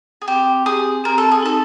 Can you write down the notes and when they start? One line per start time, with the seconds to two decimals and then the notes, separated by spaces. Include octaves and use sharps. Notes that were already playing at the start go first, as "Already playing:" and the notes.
0.22 G#4
0.28 C4 G4
0.66 G4 G#4
1.04 C4 A#4
1.18 A4
1.31 G#4
1.43 D#4 A4